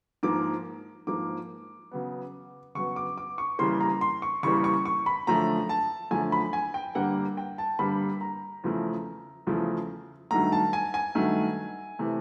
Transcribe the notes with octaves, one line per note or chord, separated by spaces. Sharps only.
G#2 F3 A#3 D6
G#2 F3 A#3 D6
C#3 F#3 B3
C#3 F#3 B3 C#6
D6
D6
C#6
C#3 E3 G3 A#3 C6
A#5
C6
C#6
C#3 E3 G3 A#3 C#6
C#6
C#6
B5
F#2 D3 F3 A3 A#5
A5
F#2 D3 F3 A3 G#5
B5
G#5
G5
G2 D3 G3 A#3 F#5
G5
A5
G2 D3 G3 A#3 B5
A#5
E2 C#3 F3 A3
E2 C#3 F3 A3
G2 D#3 F#3 A3 A#5
A5
G#5
G#5
G2 D#3 F#3 A3
C3 E3 A3